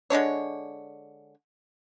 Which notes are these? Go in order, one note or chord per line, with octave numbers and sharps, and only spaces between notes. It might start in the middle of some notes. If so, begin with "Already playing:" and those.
D3 G#3 D4 C#5